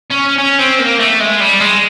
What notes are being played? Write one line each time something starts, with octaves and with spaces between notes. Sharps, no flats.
C#4
C#4
C4
A#3
A3
G#3
G3
G#3